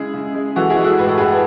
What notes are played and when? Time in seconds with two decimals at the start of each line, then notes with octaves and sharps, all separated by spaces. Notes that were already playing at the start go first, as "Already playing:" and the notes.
Already playing: C#3 G#3 E4 G#4
0.13 C#3
0.35 G#3
0.56 E3 F#4 A4
0.70 E4 G#4
0.77 G#3
0.84 F#4 A4
0.99 A2 B4
1.08 A4
1.18 A2 G#4 B4